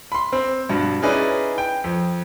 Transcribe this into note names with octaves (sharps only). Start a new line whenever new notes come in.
B5 C6
C4
G2 B2
C#4 D#4 E4 G#4 B4 D5
G5
F2